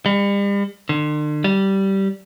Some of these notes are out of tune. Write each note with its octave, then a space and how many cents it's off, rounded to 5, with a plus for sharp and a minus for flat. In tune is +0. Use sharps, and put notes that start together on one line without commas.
G3 +40
D3 +40
G3 -15